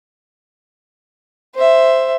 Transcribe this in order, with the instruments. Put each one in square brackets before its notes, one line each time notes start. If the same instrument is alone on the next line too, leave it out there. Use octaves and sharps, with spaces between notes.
[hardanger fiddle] C5 E5